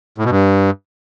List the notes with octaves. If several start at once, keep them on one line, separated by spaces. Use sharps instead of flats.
A2
B2
G2